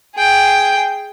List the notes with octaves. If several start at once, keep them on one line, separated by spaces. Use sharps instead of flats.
G#4 G5